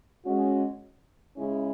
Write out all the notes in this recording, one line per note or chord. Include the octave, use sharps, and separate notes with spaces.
G#3 C#4 F#4
C#3 G#3 C#4 E4